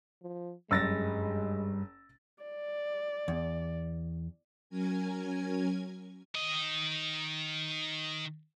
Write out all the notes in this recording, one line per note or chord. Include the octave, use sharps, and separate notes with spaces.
F3
F#1 G2 G3 G#3 E6 A6 A#6
D5
E2
F#3 C#4 A#4 G#5 G#6
D#3 D#5